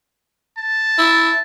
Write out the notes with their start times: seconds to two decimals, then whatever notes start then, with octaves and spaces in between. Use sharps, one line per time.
0.58 A5
0.98 E4